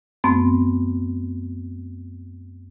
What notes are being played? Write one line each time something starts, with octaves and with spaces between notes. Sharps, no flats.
F#2 A3 B3 C4